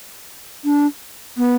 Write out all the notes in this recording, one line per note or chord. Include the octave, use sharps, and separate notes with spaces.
D4
B3